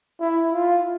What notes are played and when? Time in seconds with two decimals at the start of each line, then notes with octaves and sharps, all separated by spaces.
0.20 E4
0.52 F4